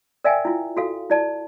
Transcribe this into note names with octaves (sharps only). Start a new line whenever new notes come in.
A#4 D5 E5 F5 G5 G#5
E4 F4
F#4 A4 F5
E4 D5 A5